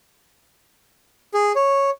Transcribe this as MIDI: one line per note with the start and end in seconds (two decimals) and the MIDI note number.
1.34 1.52 68
1.56 1.90 73